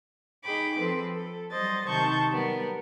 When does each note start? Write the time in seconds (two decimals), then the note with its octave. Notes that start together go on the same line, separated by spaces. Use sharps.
0.44 D#4 G#4 G5 B5 D6
0.79 F3 C4 A4 B4
1.15 A4
1.51 F#3 G3 C5 D#5 A6
1.89 C3 D#3 A5 C#6 G6
2.32 F#3 G3 B3 A#4